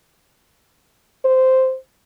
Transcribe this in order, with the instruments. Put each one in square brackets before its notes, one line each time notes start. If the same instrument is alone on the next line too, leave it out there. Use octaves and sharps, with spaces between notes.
[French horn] C5